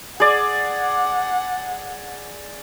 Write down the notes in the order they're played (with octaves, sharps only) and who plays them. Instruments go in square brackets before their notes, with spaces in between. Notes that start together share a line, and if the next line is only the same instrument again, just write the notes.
[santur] G#4 D5 [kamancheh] F#5